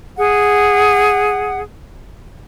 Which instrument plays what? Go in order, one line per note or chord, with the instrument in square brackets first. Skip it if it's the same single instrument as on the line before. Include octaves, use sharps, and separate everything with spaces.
[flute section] G#4 F#5